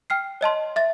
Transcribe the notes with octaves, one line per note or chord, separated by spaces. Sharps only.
G5 F6 C7
C#5 D#5 A5 C6
E5 A6